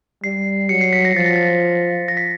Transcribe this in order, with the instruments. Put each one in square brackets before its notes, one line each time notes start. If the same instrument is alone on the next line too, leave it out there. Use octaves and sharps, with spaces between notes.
[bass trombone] G3 [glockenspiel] C7
[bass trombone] F#3 [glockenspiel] C#7
[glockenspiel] C7
B6
A#6
[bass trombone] F3 [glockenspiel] A6
[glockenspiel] A#6
A6
A#6
B6